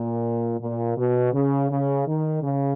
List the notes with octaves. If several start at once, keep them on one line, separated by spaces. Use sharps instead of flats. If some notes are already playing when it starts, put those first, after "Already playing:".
Already playing: A#2
A#2
B2
C#3
C#3
D#3
C#3